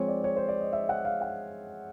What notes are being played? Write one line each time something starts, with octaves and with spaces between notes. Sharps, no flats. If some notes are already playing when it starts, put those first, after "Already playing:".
Already playing: F3 G#3 C4 C#5
D5
C#5
C5
D5
D#5
E5
F#5
F5
F#5